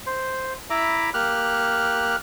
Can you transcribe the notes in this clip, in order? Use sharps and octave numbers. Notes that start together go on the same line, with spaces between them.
C5
E4 E5 A#5 B5 D6
A#3 G4 F6 F#6